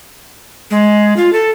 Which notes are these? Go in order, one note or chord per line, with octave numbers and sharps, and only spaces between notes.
G#3
F4
A4